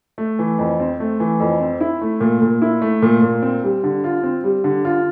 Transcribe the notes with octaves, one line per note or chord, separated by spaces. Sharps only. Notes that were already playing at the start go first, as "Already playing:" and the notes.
A3
E3
F2
C4
A3
E3
F2
C4
E4
A3
A#2
A#2
E4
A3
A#2
A#2
C4
G3
D3
F4
C4
G3
D3
F4